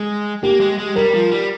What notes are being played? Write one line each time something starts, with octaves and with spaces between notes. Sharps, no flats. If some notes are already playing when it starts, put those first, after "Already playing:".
Already playing: G#3
A#3 G4
G#3
G#3
G3 A#4
F3
G3